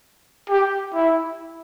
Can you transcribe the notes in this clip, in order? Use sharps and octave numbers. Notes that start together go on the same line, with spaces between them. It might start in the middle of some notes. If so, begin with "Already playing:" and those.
G4
E4